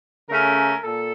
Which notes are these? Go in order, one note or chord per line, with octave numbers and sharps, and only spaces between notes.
C#3 A3 C#4 A#4
A#2 A4